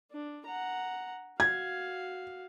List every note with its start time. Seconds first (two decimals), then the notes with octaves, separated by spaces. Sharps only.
0.11 D4
0.46 F#5 A#5
1.40 F#4 F5 G#6